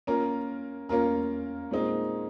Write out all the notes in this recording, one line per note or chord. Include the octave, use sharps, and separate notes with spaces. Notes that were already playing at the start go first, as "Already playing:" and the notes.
A#3 C#4 F4 A#4
A#3 C#4 F4 A#4
A#2 G#3 C4 D#4